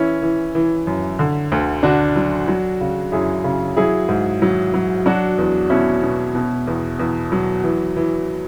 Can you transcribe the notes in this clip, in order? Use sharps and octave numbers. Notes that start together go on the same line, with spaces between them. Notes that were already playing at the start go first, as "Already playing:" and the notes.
Already playing: E3 C#4 E4
E3
E3
F#2
D3
D2
D3 D4 F#4
F#3
F#3
C#3
F#2 E4 G#4
C#3
F#3 E4 G#4
G#2
F#3
F#3
F#3 D4 F#4
E2
B2 C#4 E4
B2
B2
E2
E2
F#3
E3
E3